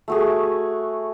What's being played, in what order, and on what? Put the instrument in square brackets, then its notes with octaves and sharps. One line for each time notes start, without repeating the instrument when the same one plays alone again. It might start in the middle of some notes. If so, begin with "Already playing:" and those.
[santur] A3 F#4 G#4